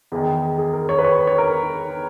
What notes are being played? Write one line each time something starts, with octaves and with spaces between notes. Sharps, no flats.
E2 D#3 G#4
G#4
A#4
C#5
B4
C#5
C#5
A#4